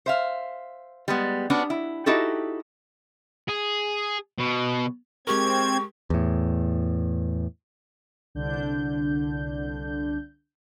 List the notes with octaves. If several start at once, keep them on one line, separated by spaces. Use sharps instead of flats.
C5 E5 F5
G3 G#3 B3
B3 C#4 D4 F#4
E4
D#4 E4 F#4 G4 A4
G#4
B2
G#3 C4 G4 A#4 C#6 G#6
E2 A2
C2 D3 D4 G6